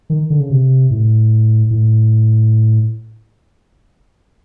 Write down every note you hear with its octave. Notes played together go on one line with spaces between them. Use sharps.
D#3
D3
C#3
C3
A2
A2